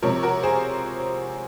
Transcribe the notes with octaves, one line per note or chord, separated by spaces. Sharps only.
C3 F3 A#4 C#5
F#4 A#4
G#4 C5